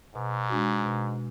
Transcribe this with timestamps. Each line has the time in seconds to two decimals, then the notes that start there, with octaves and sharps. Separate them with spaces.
0.15 G#2 B2
0.50 G#3 D4 F#4
0.86 B2